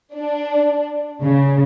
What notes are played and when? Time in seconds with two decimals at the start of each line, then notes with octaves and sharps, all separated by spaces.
0.16 D4
1.23 C#3